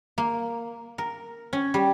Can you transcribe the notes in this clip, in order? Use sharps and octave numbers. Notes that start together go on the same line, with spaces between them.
A#3
A#4
C#4
G3